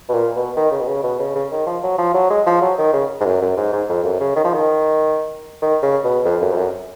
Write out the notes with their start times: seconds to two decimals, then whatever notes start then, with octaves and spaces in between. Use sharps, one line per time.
0.09 B2
0.14 A#2
0.36 B2
0.56 D#3
0.72 C#3
0.81 B2
0.88 C#3
1.04 B2
1.19 C#3
1.35 C#3
1.52 D#3
1.66 F3
1.83 F#3
1.98 F3
2.14 F#3
2.30 G#3
2.46 F3
2.62 F#3
2.78 D#3
2.93 C#3
3.21 G#2
3.26 F#2
3.41 F#2
3.57 G#2
3.73 G#2
3.89 F2
4.04 F#2
4.20 C#3
4.36 D#3
4.44 F3
4.54 D#3
5.62 D#3
5.83 C#3
6.04 B2
6.25 F2
6.42 F#2
6.51 F2
6.57 F#2